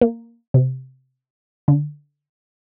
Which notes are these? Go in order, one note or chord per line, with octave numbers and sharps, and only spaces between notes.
A#3
C3
D3